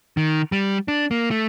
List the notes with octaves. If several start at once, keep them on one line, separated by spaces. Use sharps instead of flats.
D#3
G3
D4
A#3
A3